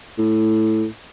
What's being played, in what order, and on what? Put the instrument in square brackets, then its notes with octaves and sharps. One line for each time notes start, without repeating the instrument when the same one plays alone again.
[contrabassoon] A2